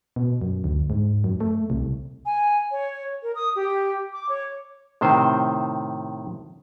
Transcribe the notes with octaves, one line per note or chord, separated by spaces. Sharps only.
B2
F#2
D2
G#2
F#2
A3
C2
G#5
C#5
A#4
D#6
G4
D6
C#5
A2 C3 D#3 C5